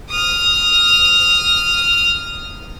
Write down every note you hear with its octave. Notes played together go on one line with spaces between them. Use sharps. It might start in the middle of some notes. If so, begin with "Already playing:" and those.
D#6 F6